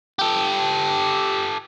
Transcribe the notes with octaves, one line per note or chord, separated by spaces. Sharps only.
G4 A4